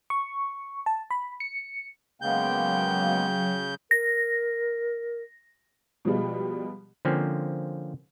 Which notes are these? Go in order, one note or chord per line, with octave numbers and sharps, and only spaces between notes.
C#6
A5
B5
C#7
C#3 F#3 G#3 A#3 B3 F5 G5 G6
A#4 A#6
B2 F3 G3 G#3
D3 F3 A#3 C4 C#4